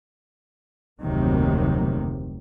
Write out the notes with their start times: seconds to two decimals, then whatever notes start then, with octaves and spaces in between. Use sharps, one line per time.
1.00 F1 D2 C3 D#3 F#3 A#3